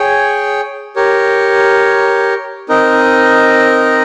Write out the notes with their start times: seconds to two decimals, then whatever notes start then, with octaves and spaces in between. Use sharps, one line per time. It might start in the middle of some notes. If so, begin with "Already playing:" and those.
Already playing: G#4 C#5 G5
0.96 G4 A#4 C#5
2.69 C4 D#4 A#4 D#5